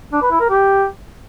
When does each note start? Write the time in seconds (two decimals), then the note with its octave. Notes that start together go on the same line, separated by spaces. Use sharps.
0.13 D4
0.22 B4
0.31 E4
0.40 A#4
0.49 G4